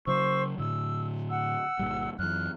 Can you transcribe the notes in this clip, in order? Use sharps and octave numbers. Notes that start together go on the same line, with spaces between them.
C#3 F#3 C5 C#6 E6
A2 D3 E6
F#5 E6
G1 A#2 G3
F#2 E3 F6 F#6